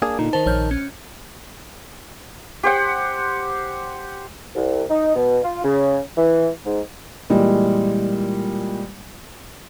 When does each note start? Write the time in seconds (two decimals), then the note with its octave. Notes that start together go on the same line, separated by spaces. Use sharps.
0.02 A#3 D4 G#4
0.19 A#2 D3 D#4
0.33 D#3 C5 A5
0.46 A#1 C#5 F6 G6
0.71 C#4
2.63 G4 C5 F#5
4.55 C2
4.90 D#4
5.16 B2
5.44 F4
5.64 C#3
6.17 E3
6.66 G#2
7.30 A#2 E3 G3 G#3